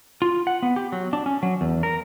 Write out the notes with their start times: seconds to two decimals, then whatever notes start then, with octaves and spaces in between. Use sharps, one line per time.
0.22 F4
0.47 F#5
0.63 B3
0.76 G4
0.92 F#3
1.13 D4
1.26 C#4
1.43 F#3
1.61 E2
1.83 A#4